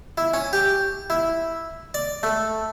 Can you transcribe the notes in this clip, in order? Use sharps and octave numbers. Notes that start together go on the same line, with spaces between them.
E4
C#4
G4
E4
D5
A3